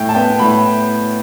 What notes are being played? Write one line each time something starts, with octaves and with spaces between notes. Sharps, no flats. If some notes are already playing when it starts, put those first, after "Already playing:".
Already playing: A2 G5
A5
B3 G5
A2 B5